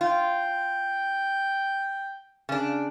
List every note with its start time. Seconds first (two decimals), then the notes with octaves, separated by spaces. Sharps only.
0.01 F4 G5
2.49 C#3 D4